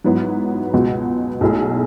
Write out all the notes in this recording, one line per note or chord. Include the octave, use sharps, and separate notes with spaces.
G#2 F#3 B3 E4
C#2 B2 G#3 B3 F#4
B1 B2 A3 E4 G#4